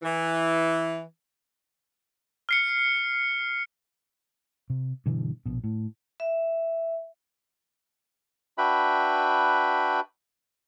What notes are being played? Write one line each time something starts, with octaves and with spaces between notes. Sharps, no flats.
E3
F6 C7 C#7
C3
G2 B2 D3 E3
A#1 B2
A2
E5
D4 F#4 B4 E5 G5 B5